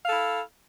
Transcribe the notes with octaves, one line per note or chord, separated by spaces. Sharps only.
E4 A4 F5